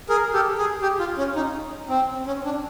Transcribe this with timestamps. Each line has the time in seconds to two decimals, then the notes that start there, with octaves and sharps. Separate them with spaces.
0.09 G#4 A#4
0.33 G4 A4
0.58 G#4
0.82 G4
0.99 F4
1.18 C#4
1.36 D#4
1.89 C4
2.26 C#4
2.45 D4